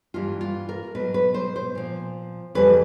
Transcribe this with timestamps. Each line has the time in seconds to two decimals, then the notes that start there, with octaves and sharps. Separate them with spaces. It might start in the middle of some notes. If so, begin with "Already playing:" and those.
0.14 G2 E3 G3 F4
0.41 F4
0.69 A#4
0.95 B2 F#3 B4
1.14 B4
1.34 C5
1.56 C5
1.75 A#2 F3
2.55 F2 C#3 E3 G3 B4